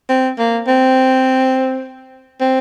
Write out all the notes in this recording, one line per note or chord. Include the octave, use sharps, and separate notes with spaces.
C4
A#3
C4
C4